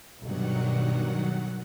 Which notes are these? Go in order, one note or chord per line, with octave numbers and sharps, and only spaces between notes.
B1 G2 B2 D#3 F#3 F#5